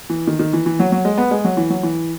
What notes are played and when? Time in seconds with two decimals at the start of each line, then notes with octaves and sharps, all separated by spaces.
0.10 E3
0.27 D#3
0.39 D#3
0.53 E3
0.66 E3
0.80 F#3
0.92 F#3
1.05 G#3
1.18 B3
1.31 G#3
1.45 F#3
1.57 E3
1.70 F#3
1.83 E3